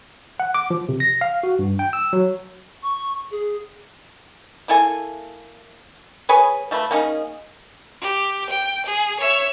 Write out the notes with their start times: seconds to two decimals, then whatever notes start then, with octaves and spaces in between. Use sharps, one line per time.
0.40 F#5
0.54 D6
0.70 F3
0.89 C3
1.00 A#6
1.21 F5
1.43 F#4
1.59 G2
1.79 G5
1.93 E6
2.13 F#3
2.83 C#6
3.31 G#4
4.68 A#3 E4 A4 G#5
6.29 G#4 B4 C#5 G#5
6.71 F3 A3 B4
6.91 A#3 C#4 D#4 G#4
8.02 G4
8.50 G5
8.86 G#4
9.20 C#5 E5